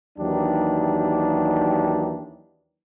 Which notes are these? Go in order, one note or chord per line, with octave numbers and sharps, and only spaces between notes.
D#2 E3 F#3 D4 D#4 G4